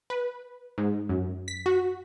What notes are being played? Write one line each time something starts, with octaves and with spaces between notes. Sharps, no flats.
B4
G#2
F#2
B6
F#4